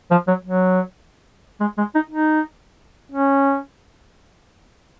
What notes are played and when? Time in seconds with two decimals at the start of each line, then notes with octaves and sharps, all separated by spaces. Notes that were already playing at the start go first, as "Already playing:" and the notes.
0.11 F3
0.28 F#3
0.45 F#3
1.61 G#3
1.78 G#3
1.95 D#4
2.11 D#4
3.12 C#4